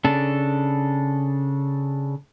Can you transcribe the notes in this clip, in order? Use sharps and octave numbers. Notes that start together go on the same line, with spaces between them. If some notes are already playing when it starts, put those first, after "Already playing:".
C#3 D4 A4